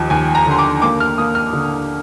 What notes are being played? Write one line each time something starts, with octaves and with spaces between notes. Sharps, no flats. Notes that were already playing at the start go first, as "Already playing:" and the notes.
Already playing: D#2 F3
D#2 G#5
A#5
D3 C6
D6
A#3 D6
F6
A#3 D#6
F6
D3